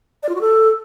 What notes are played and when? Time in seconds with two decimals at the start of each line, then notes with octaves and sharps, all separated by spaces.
0.23 D5
0.29 F4
0.35 F#4
0.41 A4